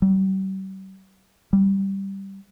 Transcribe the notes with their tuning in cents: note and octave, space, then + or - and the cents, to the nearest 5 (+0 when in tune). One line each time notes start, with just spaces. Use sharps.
G3 -40
G3 -5